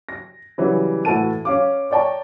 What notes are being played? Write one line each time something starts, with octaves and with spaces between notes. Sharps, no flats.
A#6
C#3 E3 F#3 G3
A2 E3 F#4 A4 A5 D#7
C#4 F5 D6
C#5 D5 G5 A5 A#5 C#6